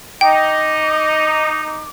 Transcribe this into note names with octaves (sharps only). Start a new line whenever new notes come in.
D#4 D#5 G5 D6